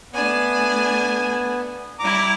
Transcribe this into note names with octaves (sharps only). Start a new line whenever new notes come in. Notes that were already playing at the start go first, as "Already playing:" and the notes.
A3 B3 D4 G#5
G3 E4 A#5 D6